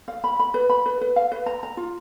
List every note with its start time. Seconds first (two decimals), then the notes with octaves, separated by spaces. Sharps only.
0.08 F5
0.24 B5
0.39 B5
0.54 B4
0.70 B5
0.86 B4
1.01 B4
1.16 F5
1.32 B4
1.46 A#5
1.63 A#5
1.77 F4